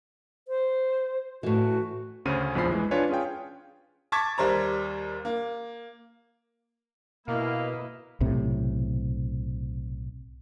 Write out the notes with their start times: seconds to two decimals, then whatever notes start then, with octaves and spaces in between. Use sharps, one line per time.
0.48 C5
1.43 A2 E3 F#4
2.25 D2 C#3 C#4 G#4 C5 D#7
2.55 A#1 E2 F3 C5 B5 C7
2.71 E3 G#3
2.91 D4 F4 B4 C#5 G#5
3.09 C#4 F4 G#4 F5 G5
4.12 A5 C#6 D6 G#6 A6 B6
4.38 D#2 G3 C5 A#5
5.25 A#3
7.28 B2 A#3 E4 B4 D#5 F5
8.21 B1 A2 C3